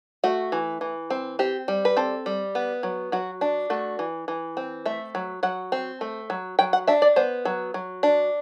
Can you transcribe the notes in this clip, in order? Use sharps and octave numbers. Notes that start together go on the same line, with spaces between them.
A3 F#4
E3
E3
C4
C4 G4
G3
B4
C4 A4
G3
B3
F#3
F#3 F#4
D4
A3 F#4
E3
E3
C4
A3 E5
F#3
F#3 F#5
C4
A3
F#3
F#3 G5
F#5
D4 E5
D5
B3 C5
F#3
F#3
D4